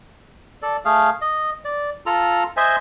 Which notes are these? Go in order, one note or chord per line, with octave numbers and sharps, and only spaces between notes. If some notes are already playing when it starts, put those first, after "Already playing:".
A4 D5
A3 G#4 F5
D#5
D5
F4 A4 A#5
C5 D#5 E5 G#5